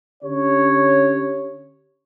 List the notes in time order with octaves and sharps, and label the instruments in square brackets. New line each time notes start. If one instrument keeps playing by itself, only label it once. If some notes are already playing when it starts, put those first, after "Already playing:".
[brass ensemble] D3 C#4 G4 C#5